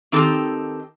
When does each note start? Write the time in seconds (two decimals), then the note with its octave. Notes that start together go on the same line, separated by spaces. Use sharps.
0.12 D#3 C4 D#4 G4 A4